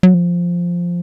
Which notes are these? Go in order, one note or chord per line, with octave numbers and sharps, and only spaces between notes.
F#3
F3